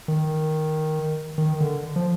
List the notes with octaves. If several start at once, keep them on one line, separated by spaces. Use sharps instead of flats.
D#3
D#3
D3
F3